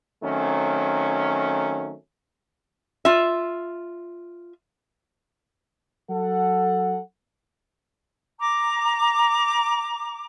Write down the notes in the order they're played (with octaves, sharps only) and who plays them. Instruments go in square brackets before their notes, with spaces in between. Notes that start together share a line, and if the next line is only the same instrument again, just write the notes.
[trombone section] D#3 F#3 A3 C4 C#4
[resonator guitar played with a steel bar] F4 E5
[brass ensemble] F#3 A4 F#5
[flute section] A#5 D6